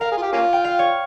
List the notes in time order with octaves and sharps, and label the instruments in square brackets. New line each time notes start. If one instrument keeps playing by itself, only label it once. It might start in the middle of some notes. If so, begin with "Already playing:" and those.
[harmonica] A#4 [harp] F5
[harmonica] G#4
F4
G4
A#3 C#4 F4
[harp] G5
F5
C#5